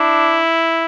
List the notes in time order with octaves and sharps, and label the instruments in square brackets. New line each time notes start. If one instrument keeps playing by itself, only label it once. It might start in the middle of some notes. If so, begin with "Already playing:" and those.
Already playing: [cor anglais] D4 [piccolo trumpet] E4